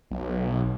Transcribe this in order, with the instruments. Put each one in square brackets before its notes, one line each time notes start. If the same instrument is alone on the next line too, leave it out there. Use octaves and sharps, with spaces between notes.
[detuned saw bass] B1